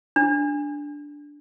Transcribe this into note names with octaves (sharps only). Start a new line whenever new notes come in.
D4